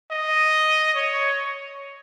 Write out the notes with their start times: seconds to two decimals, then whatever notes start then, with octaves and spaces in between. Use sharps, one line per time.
0.11 D#5
0.95 C#5